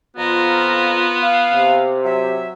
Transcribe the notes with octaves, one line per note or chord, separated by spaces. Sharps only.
F2 B3 F4 A#5
F5
C3
F#3 E5